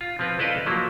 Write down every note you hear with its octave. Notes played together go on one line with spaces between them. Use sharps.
F4
F3 C4 F4 B4
E4 A4 B4 D5 D#5 F5
F3 F#3 A#3 E4